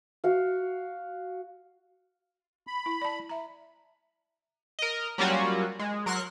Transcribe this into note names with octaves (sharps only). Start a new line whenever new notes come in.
F#4 F5
B5
E4
D5 A5
E5 A#5
A#4 D#5
F#3 G3 A#3 C#4 F4 F#4
G#3
F#3 A#4 C6 C#6 F#6